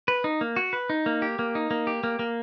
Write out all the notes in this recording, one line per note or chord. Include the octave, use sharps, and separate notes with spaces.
B4
D#4
A#3
F#4
B4
D#4
A#3
G4
A#3
D#4
A#3
G4
A#3
A#3